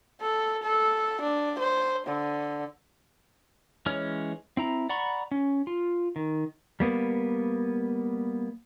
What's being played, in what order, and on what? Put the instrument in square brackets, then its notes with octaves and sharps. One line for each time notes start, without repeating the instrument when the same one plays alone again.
[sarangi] A4
A4
D4
C5
D3
[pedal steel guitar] E3 G#3 C#4 C#5 F6
C4 E4 A#5
D5 F#5 A#5 B5 C#6
C#4
F4
D#3
[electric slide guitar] G3 A#3 B3